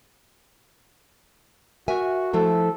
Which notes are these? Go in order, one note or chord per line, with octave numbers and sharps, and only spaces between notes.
F#4 A#4 E5 G#5
F3 A3 E4 A4